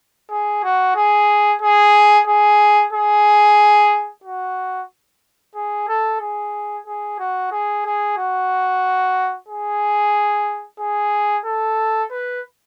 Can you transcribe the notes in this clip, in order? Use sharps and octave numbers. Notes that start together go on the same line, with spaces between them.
G#4
F#4
G#4
G#4
G#4
G#4
F#4
G#4
A4
G#4
G#4
F#4
G#4
G#4
F#4
G#4
G#4
A4
B4